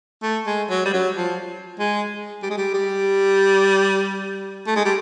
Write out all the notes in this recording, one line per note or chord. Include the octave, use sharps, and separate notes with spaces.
A3
G#3
F#3
G3
F#3
F3
G#3
G3
G#3
G3
G3
A3
G#3
G3